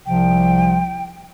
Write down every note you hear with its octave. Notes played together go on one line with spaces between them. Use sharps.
C2 C3 F3 G5